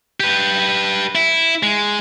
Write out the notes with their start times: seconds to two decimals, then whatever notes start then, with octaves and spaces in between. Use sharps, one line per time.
0.20 G4 B4
1.15 E4
1.63 G#3